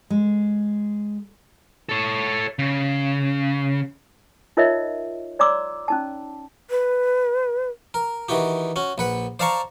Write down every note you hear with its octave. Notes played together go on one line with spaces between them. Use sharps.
G#3
A4 C#5
C#3
D#4 F4 A#4 C#5 D#5 E5
C#5 D5 A#5 C6 D6 E6
C#4 D#4 A5
B4
A#4
D#3 E3 F#4 G4
C#4 F#4
A#1 B4 F#5
C5 D5 F5 A5 A#5 C#6